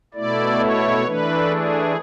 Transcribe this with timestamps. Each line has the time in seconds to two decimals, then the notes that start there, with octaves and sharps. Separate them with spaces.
0.14 B2 A3 E4 D5
0.60 C#5
1.05 E3 A3 D4 B4
1.50 G#4